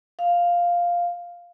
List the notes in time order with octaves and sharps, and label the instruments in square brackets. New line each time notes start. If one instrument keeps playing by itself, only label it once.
[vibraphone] F5